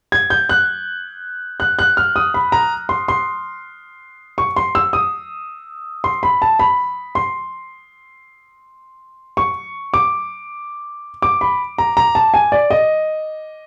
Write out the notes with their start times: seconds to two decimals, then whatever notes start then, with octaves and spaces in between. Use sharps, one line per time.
0.12 G#6
0.30 G6
0.49 F#6
1.60 F#6
1.79 F#6
1.97 F6
2.16 D#6
2.34 B5
2.52 A#5
2.89 C6
3.08 C6
4.38 C#6
4.56 C6
4.75 E6
4.93 D#6
6.04 C6
6.23 B5
6.42 A5
6.59 B5
7.15 C6
9.37 C#6
9.94 D6
11.22 D6
11.41 B5
11.78 A#5
11.97 A#5
12.15 A5
12.34 G#5
12.52 D5
12.70 D#5